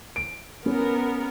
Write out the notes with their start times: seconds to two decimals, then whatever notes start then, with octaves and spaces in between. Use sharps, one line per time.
0.16 D7
0.66 B3 C#4 A#4